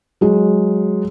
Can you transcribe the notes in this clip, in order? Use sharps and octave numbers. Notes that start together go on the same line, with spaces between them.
F#3 G#3